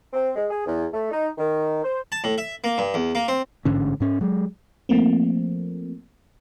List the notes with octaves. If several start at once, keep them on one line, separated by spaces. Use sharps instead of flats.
C4
G#3
G#4
E2
A3
D#4
D#3
C5
A5
A2
E5
A#3
G2
E2
A#3
C4
A1 G#2 D3 C#4
G#2 C#4
F#3 G#3
F3 A3 A#3 C4